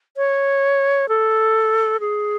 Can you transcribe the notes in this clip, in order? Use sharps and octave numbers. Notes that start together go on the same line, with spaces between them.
C#5
A4
G#4